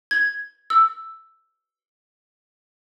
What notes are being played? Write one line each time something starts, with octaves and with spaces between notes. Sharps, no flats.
G#6
E6